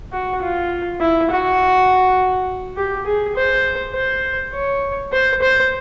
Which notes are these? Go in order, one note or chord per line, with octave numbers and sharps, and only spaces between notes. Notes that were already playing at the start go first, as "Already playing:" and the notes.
F#4
F4
E4
F#4
G4
G#4
C5
C5
C#5
C5
C5